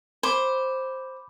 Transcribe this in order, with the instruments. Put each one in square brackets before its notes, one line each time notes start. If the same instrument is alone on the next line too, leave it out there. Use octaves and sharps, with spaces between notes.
[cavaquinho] C5 [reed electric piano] B5 D6